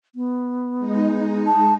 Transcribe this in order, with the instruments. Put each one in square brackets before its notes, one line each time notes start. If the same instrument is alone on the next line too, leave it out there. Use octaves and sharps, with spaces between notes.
[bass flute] B3
[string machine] G#3 D#4
[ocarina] A5